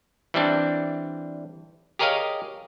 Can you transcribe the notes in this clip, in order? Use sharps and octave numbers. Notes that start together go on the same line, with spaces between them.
E3 G3 C4 D4
G4 G#4 A#4 C#5 D#5 F5